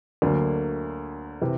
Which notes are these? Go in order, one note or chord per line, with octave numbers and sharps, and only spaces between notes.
D2 D3 F#3 A#3
C3 E3